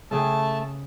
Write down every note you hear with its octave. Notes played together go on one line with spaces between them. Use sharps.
C#3 A3 G#4 G5 A5